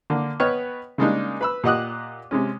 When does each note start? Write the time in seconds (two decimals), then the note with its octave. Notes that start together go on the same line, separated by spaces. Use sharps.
0.10 D3 A#3
0.40 B3 B4 C#5 D#5 G5 F6
0.98 C#3 G3 G#3 A#3 D4 D#4
1.41 B4 B5 E6
1.64 A#2 G4 D#5 F#5 D#6 F#6
2.31 C3 G#3 C#4